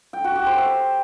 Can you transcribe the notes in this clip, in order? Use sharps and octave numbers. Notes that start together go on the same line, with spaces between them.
G5
F#4
G4
C5
E5